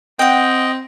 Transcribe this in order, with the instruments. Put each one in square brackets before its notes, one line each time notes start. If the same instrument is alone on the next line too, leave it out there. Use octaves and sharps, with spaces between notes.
[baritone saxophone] C4 [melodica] D#5 [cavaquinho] F#5 G5